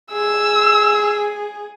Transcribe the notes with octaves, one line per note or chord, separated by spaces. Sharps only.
G#4 E6